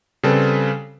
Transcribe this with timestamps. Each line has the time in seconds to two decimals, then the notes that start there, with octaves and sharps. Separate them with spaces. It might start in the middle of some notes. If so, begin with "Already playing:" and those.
0.23 C#3 G3 C4 A4 B4